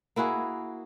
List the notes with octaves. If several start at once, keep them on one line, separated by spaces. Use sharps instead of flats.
A#3 E4 F#4 G#4